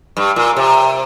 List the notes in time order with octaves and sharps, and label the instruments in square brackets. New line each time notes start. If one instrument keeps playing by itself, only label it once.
[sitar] G2
A#2
C3